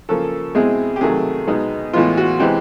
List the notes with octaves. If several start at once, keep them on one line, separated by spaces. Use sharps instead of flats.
C#3 F3 A#3 C#4 A4
B2 G#3 C4 E4 G#4
G4
C3 D#3 F#3 A3 G#4
B2 G#3 B3 D#4
A2 E3 G#3 B3 F4
F#4
C3 E3 G#3 C4 G4